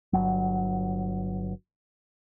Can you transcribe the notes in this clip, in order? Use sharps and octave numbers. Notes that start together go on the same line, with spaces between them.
G1 F#3